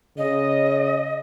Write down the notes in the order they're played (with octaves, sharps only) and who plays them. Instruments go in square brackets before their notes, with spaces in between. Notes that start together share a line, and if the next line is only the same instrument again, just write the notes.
[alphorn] C#3 [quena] D#5